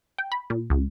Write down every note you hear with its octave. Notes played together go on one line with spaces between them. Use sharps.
G5
B5
A#2
C#2